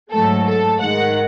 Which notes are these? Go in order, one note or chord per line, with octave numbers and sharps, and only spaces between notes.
G#2 F#3 A3 A4
A4
G#2 D#3 G#3 F#5